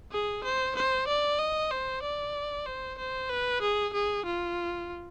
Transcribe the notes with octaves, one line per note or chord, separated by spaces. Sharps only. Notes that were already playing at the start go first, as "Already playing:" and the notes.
G#4
C5
C5
D5
D#5
C5
D5
C5
C5
B4
G#4
G#4
F4